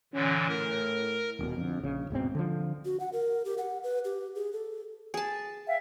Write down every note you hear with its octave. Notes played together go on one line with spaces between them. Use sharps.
A#2 D3 E3 C#4
A2 A#4
D#1 B2
F2 D3
A#1 C#3
D1 G#2 B2 C4
D3 F3
F#4
F#5
A#4
G4
F#5
B4
G4
G#4
A4
G#4 A5
E5 F5 G5